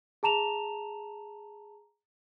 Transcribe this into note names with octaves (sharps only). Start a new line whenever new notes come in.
G#4 A5 A#5 E7 F7